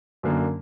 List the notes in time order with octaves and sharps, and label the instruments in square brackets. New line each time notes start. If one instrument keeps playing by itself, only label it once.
[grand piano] F#2 D3 F#3 A#3